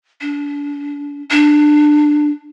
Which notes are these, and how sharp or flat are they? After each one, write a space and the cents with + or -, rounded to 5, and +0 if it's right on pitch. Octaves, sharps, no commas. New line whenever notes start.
D4 -35
D4 +15